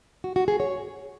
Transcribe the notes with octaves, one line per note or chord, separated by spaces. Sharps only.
F#4
F#4
G#4
C#5